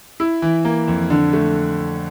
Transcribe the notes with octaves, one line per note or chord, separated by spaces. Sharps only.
E4
E3
A#3
F2
D3
A3